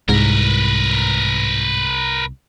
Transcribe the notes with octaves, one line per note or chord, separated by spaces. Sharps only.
C2 G#2 A#4 B4